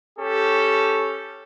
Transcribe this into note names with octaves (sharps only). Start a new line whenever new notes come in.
C#4 G4 A4